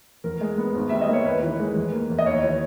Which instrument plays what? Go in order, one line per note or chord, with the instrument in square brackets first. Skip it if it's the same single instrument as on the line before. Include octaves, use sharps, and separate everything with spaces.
[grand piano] E2 A#4
G#3
B3
G#1
G3 E5
D#5
A#3
C#5
D#2 B4
E3
G#3
E2
A#3
E2
D#5
D#2 C#5
E3